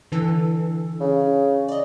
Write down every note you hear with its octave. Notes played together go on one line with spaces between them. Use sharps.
D3 E3 A4
C#3
D5 D#5